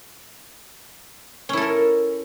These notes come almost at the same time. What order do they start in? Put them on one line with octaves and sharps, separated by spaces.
C#4 E4 A4 A#4